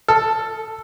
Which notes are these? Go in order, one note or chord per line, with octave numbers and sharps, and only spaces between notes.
A4